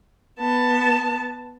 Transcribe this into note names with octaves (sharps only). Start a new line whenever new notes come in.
B3 A5